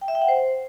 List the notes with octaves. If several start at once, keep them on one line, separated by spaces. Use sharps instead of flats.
G5
E5
G5
F#5
C5